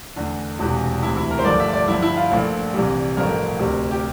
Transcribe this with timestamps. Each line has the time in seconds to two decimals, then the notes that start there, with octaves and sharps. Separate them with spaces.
0.16 E2 D3 A3
0.59 E1 E2 C3 E3
1.02 D2 C3 E3 E4
1.17 E4
1.31 A#4
1.39 C5
1.45 G1 G2 F3 A3 D5
1.60 E5
1.73 D5
1.87 G1 G2 F3 E4
2.02 E4
2.16 F4
2.31 A#1 A#2 F3 A3
2.74 C2 C3 E3 G3
3.16 A1 G2 F3 A3 A#4
3.59 D2 C3 G3
3.91 G4